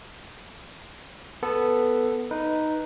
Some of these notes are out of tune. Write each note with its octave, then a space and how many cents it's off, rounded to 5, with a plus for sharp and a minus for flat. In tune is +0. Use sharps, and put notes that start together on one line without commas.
B3 +0 A4 +0
D#4 +0 B4 -10